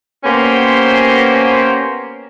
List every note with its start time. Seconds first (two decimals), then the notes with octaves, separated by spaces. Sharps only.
0.24 A#3 B3 C#4 G4 C5